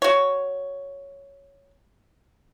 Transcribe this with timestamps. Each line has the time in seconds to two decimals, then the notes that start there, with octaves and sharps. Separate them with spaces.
0.02 F#4 C#5